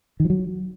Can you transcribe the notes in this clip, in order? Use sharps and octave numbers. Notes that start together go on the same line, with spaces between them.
D#3
F3
F#3